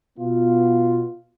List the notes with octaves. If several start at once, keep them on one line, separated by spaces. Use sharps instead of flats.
B2 B3 F4